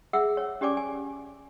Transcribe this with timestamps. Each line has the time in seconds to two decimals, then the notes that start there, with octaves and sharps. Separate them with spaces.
0.13 G#4 E5 F#5 E6
0.37 C#5
0.61 C#4 G4 D5 G#5 D6
0.77 G#5